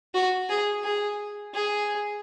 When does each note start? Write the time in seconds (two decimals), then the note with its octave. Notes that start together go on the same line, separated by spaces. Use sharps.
0.14 F#4
0.49 G#4
0.84 G#4
1.54 G#4